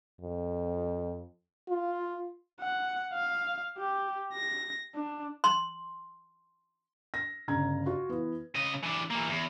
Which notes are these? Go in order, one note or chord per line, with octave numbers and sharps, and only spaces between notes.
F2
F4
F#5
F5
G4
A#6
D4
C6
A#6
G1 C#3 A#5 G#6
F4 F#4
E3 B3
C#3 D#5
E3 D4
E3 A#3
E2